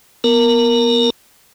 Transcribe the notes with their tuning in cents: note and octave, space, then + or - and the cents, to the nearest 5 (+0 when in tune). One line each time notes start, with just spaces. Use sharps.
B3 -20 A#4 +0 A#5 -40